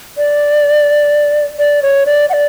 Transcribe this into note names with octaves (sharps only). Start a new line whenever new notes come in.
D5
D5
C#5
D5
F#5
D5